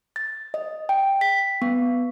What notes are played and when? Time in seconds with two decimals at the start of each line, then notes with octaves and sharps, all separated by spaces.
0.16 A6
0.54 D#5
0.89 G5
1.21 B6
1.62 B3